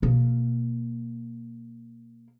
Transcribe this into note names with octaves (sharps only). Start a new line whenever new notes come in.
B2 A#3